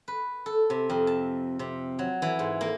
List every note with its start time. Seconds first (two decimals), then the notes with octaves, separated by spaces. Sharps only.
0.08 B4
0.46 A4
0.70 C3
0.90 F2
1.07 A5
1.59 C3
1.99 F#3
2.22 E3
2.39 G#2
2.61 A#3